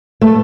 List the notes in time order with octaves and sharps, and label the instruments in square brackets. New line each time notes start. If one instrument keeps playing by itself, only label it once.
[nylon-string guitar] A3